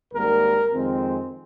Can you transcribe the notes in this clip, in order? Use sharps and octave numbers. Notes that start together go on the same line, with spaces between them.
G#1 G#2 G3 A#3 A#4
F2 D#3 G#3 C4